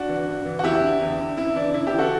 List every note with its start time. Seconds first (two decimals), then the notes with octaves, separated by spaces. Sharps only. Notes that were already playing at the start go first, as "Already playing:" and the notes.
Already playing: D4 F#4
0.09 E3
0.27 G2
0.45 E3
0.59 F#4
0.63 E2 E4 G4
0.82 D3
1.01 E2
1.19 D3
1.37 F#2 E4
1.55 C#3 E3 D4
1.74 F#2 E4
1.87 E4 G4
1.92 C#3 E3
1.98 F#4 A4